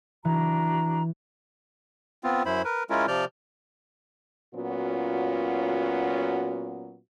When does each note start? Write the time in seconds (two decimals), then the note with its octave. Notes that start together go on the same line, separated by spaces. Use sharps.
0.25 E3 D4 F#4 A#5
2.24 B3 C4 F4
2.45 F#2 E4 C5 B5
2.65 A#4 B4
2.90 G#3 C#4 E4 F4 A#4
3.08 C3 F3 D5 F6 G6
4.55 A#2 F#3 B3 C#4 F4 F#4